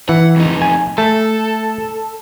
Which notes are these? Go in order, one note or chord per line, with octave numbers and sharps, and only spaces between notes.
E3 F#5
F2 D#4
G#5
A3 A4